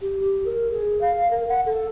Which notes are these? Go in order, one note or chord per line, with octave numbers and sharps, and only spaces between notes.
G4
G4
A#4
G#4
F5
A#4
F#5
A4